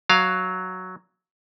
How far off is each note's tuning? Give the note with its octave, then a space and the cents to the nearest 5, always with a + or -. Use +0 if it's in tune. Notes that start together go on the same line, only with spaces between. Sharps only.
F#3 +0 F5 +0